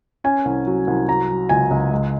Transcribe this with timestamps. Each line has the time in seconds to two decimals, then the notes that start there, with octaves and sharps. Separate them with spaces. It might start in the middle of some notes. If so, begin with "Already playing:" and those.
0.24 C#4 G#5
0.45 C2
0.67 F#3
0.87 C2
1.08 F#3 A#5
1.29 F#3
1.49 C#2 G#5
1.71 C#2
1.91 G#3